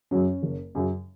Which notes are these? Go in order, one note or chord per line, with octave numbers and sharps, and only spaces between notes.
F#2 C#3 F#3 C#4
F#1
F#2 C#3 F#3